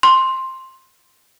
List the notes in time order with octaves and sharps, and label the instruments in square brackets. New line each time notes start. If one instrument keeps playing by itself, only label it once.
[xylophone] C6